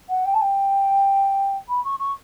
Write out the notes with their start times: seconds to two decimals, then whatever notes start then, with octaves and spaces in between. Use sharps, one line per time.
0.09 F#5
0.25 G5
0.34 A5
0.41 G5
1.68 B5
1.84 C#6
2.00 C#6